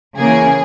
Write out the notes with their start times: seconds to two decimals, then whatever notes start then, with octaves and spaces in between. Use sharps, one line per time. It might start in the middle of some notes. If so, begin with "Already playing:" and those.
0.18 C#3 E3 A#3 G#4